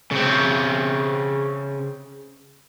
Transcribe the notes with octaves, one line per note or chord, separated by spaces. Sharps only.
C#3 C4